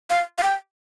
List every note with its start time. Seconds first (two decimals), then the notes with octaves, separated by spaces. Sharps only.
0.10 F5
0.38 F5
0.43 G5